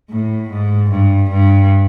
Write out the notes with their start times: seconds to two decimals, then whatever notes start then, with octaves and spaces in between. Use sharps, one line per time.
0.10 A2
0.50 G#2
0.90 G2
1.30 G2